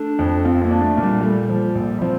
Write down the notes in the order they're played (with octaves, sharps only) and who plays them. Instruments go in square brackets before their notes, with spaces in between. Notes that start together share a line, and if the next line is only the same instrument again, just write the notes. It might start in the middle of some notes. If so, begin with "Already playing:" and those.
Already playing: [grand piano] A3 [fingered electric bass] D4
[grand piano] F2
[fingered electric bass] C4 [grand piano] F4
[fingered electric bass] A#3
[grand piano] D4
[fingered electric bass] A3
[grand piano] A#2
[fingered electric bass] G3
[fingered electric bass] G3 [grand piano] A3
[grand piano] F3
A#1
[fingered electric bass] F3 [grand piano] C4